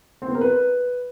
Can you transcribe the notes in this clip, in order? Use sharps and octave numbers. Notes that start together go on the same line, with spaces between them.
C4
B3
A#4
B4